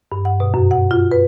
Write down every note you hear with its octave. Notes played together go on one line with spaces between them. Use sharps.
G2
F#5
B2
F#2
F#5
F4
B4